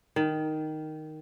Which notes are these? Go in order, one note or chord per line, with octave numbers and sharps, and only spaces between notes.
D#3